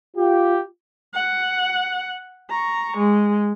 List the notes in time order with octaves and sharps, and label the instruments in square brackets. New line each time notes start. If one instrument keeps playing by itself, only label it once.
[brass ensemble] F4 G4
[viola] F#5
A#5 C#6
G#3